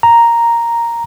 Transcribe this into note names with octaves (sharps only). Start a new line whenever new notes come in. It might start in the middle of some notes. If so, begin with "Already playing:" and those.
A#5